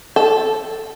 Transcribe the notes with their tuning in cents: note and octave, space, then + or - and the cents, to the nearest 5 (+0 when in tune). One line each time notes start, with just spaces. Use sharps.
A4 +0 A5 -20